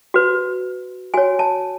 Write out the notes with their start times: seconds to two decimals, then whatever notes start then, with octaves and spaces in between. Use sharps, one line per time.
0.14 F#4 B4
1.14 F#4 C#5 G#5
1.39 A5